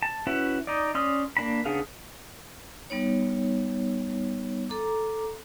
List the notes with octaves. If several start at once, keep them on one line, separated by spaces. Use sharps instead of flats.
A5
C#4 E4 F#4 B4
D#4 D5
C#4 D5 C6 D#6 F6
A#3 D4 B5
C#3 B3 D4 G#4 F5
G3 B3 D#4 C#5
A4 A#5 D6